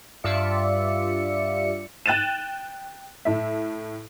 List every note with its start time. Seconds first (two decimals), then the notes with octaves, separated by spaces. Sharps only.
0.24 G2 F4 D5 E5 C#7
2.06 G5 F#6 A6 D#7 E7
3.25 A2 E5